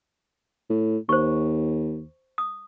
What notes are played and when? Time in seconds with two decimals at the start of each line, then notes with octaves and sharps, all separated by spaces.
0.70 A2
1.09 D#2 C5 C#6
2.38 D#6